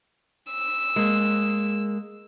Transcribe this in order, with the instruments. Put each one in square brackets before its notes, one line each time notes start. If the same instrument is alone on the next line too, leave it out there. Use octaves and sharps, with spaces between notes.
[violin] E6
[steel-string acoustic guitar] G#3 A#3